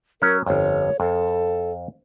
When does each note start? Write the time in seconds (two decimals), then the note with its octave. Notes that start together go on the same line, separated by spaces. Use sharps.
0.22 F#3 C#4 A#4
0.46 G1 F2 C#5
1.00 F2 A4